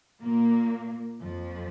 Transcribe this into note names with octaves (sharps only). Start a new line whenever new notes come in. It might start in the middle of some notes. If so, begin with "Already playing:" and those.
A#2 A#3
F2 F3